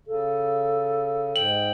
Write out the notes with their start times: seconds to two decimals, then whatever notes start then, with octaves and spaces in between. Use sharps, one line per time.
0.07 C#3 A4
1.36 G#2 G5 F#7